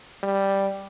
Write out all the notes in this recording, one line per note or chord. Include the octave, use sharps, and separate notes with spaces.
G3